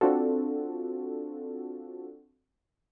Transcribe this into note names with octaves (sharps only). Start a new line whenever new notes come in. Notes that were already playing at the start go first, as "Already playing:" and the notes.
C4 D4 F4 F#4 A4